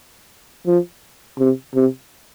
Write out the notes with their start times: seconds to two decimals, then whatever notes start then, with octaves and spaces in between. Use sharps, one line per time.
0.67 F3
1.39 C3
1.75 C3